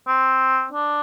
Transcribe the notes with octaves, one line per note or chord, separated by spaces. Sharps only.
C4
D4